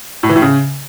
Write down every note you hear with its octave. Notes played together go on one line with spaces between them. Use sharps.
A2
E3
A2
C#3